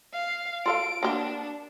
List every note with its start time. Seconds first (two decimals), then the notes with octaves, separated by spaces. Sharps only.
0.13 F5
0.66 F4 A4 F5 D7
1.03 A#3 D4 F#4 G4